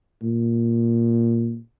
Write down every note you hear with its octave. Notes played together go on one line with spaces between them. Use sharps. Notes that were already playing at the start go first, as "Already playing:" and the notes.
A#2